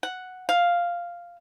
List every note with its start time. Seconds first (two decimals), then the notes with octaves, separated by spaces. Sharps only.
0.03 F#5
0.49 F5